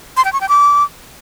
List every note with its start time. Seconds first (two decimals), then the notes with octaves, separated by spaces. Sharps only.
0.17 C6
0.25 G5
0.33 C#6
0.41 G5
0.49 D6